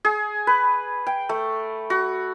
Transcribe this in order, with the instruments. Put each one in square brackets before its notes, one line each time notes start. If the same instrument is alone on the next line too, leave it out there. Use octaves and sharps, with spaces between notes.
[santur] G#4
B4
G5
A3
F#4